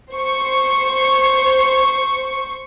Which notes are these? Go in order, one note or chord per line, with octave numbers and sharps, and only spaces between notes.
C5 C#6